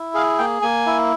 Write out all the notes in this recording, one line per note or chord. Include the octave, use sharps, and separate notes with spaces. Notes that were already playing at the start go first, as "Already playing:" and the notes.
Already playing: E4
G#4 F5
A#3 G5
A#3 G#5
E4